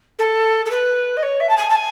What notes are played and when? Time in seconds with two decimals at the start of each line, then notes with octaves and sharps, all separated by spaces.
0.18 A4
0.65 A4
0.70 B4
1.16 D#5
1.22 C#5
1.40 E5
1.49 A5
1.57 G#5
1.69 A5
1.75 G#5